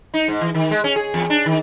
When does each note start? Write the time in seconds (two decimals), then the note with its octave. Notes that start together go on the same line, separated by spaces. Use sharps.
0.14 D#4
0.28 G#2
0.41 E3
0.54 D#3
0.71 G#3
0.84 C#4
0.96 G#4
1.14 E2
1.30 D4
1.46 D#3